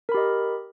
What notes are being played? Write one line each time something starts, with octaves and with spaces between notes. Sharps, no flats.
G4 A#4 D#5 B5